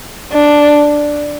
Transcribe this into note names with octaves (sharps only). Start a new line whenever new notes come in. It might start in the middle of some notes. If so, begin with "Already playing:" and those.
D4